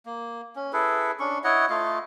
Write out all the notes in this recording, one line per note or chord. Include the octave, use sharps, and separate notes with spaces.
A#3
C#4
E4 G#4 A4 B4
C#4 D4 C#6
E4 C#5 D#5 F#5
A3 F4 D#5 F5